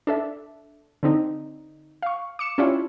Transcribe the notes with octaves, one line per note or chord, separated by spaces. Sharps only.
D4 A4 E5
D3 C4 D#4
F5 C#6
D6 C#7 E7
C#4 D4 E4 F4 G4 C#5